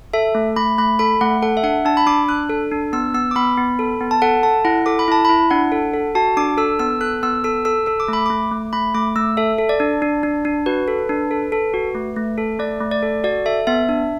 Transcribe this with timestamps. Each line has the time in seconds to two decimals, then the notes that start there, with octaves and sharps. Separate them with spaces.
0.13 A4 E5
0.35 A3
0.56 A3 B5
0.78 A3 B5
0.99 A4 B5
1.21 A3 F#5
1.42 A4 F#5
1.57 E5
1.63 D4 F#5
1.85 D4 A5
1.97 B5
2.07 D4 D6
2.28 D4 F#6
2.50 A4
2.71 D4
2.93 B3 E6
3.14 B3 E6
3.31 D6
3.36 B3 B5
3.57 B3
3.79 A4
4.00 B3
4.11 A5
4.22 A4 F#5
4.43 A4 A5
4.65 E4 F#5
4.86 A4 D6
4.99 B5
5.08 E4 A5
5.25 E4 B5
5.50 D4 F#5
5.72 A4
5.94 A4
6.15 F#4 A5
6.37 D4 D6
6.57 A4 E6
6.79 B3 E6
7.01 A4 F#6
7.23 B3 E6
7.44 A4 E6
7.65 A4 E6
7.86 A4 E6
8.00 D6
8.08 A3 B5
8.26 A3 D6
8.51 A3
8.73 A3 B5
8.94 A3 D6
9.16 A3 E6
9.37 A4 E5
9.58 A4
9.69 D5
9.80 D4
10.02 D4
10.23 D4
10.45 D4
10.66 F#4 B4
10.88 A4
11.09 D4
11.31 A4
11.52 A4
11.74 F#4
11.95 A3
12.16 A3
12.38 A4
12.59 A3 D5
12.81 A3
12.91 D5
13.02 A4
13.24 F#4 D5
13.46 A4 E5
13.67 B3 E5
13.89 D4